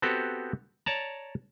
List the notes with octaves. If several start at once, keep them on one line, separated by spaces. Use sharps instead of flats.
B3 C4 F#4 G4 A4
C#5 D5 A5 A#5